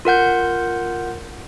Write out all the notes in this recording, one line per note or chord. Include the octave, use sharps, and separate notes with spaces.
F4 A#4 F#5 G6